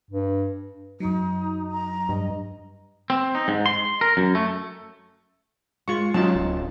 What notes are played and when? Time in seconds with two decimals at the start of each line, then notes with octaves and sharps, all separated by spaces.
0.11 G2
1.00 F#2 F#3 D#4
1.72 A#5
2.09 G2 D#5
3.10 C4
3.35 D#4
3.48 G#2
3.66 C6
4.01 A#4
4.17 F#2
4.35 A3
5.88 G#3 F4 C#6
6.14 F#3 C#4 D#4 F4 A5
6.35 D1